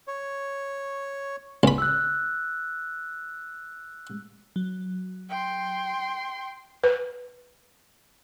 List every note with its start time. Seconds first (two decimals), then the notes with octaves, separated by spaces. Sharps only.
0.08 C#5
1.63 C#2 B5
1.78 E6 F#6
4.56 F#3
5.30 G5 C6
6.84 B4